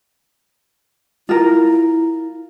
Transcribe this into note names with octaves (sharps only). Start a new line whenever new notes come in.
E4 F4 A#4